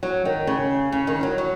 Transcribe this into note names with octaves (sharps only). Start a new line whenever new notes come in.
F#3
D#3
C#3
C#3
D#3
F#3
F#3